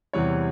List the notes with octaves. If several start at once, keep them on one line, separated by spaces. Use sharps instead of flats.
E2 C3 E3 G3 C#5